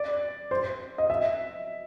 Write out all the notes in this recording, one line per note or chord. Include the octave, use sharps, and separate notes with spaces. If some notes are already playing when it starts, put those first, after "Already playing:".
Already playing: D5
C5
D#5
E5